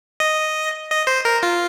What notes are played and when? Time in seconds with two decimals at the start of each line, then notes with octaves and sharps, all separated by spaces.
0.20 D#5
0.90 D#5
1.07 C5
1.25 A#4
1.43 F4